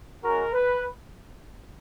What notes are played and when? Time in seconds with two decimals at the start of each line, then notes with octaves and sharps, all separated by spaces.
0.23 G#3 C#4 F#4 A#4
0.53 B4